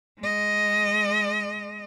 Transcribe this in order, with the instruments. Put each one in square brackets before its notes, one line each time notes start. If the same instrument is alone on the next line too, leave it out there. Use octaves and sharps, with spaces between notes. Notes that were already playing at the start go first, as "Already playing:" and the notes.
[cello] G#3 D#5